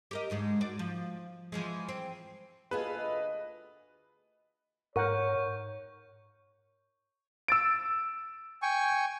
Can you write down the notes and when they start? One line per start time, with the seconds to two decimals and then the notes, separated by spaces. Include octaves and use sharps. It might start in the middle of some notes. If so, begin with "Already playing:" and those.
0.11 G4 A#4 D#5
0.30 D2 G#2 G#3
0.61 F#4 D5
0.79 F3
1.52 E3 F3 G#3
1.89 C4
2.71 D2 F4 G#4 A4 B4 D#5
4.96 G#2 A#4 C#5 F#5 C#6 G6
7.48 E6 A6 D7
8.62 G5 G#5 C#6